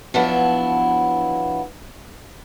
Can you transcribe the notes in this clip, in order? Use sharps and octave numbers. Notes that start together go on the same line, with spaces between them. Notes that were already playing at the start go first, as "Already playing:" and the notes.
F3 F#3 B3 D4 E4